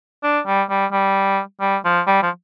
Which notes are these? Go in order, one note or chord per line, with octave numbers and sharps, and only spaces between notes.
D4
G3
G3
G3
G3
F3
G3
F3